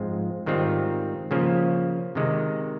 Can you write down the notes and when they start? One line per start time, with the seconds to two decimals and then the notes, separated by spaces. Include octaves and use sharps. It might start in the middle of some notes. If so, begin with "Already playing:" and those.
Already playing: G#2 F3 G#3 C4 F4
0.46 G#2 D#3 G3 C4 F4
1.31 C#3 F3 A#3 C#4
2.15 C3 D#3 G#3